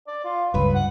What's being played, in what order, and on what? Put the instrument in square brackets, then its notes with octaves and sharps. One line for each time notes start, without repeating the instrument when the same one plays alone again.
[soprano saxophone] D5
F4
[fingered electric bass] C#2 G2 [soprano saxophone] B4
[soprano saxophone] F#5